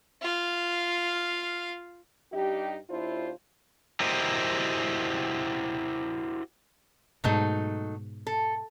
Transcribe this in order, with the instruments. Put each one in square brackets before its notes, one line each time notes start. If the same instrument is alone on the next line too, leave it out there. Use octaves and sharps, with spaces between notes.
[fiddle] F4 F5
[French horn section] G2 D#4 G4
D#2 D4 E4 F4 C5
[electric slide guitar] E4 F#4 G4 A#4 C5 D#5
[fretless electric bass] G#2 B2 [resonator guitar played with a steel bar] F#3 A3 D#4
[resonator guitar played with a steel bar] A4